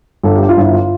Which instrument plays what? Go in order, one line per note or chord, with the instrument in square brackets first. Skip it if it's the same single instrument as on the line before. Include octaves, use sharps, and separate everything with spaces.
[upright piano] G1 A4
G2 G4
F4
G1 E4
F4